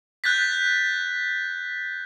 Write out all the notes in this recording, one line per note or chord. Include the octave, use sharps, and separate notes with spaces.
F#6 G6 A6 B6